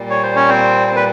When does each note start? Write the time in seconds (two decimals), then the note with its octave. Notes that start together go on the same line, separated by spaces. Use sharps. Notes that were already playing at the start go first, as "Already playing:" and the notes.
Already playing: A#2 G3
0.10 C#5
0.23 C5
0.36 C#4 C#5
0.49 C4 C5
0.88 C5
0.96 B4